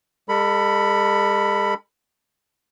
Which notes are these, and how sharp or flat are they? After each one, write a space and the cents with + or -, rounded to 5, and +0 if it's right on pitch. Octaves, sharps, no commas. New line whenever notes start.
G#3 -40 A4 +35 B5 +0